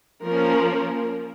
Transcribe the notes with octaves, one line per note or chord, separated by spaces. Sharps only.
F3 A#3 C#4 A#4